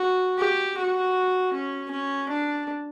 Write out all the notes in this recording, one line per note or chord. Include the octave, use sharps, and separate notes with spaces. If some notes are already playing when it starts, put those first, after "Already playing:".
Already playing: F#4
G4
F#4
C#4
C#4
D4